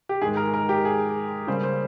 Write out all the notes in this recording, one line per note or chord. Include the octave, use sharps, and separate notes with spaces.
G4
G#2 D#3 G#3 G#4
A#4
A#4
G4
G#4
C#3 G3 A#3 C5
C5